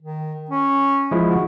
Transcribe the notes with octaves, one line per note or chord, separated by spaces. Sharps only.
D#3
C#4
F3 G#3 E4
F#4